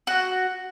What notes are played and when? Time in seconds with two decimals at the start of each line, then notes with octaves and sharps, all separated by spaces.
0.07 F#4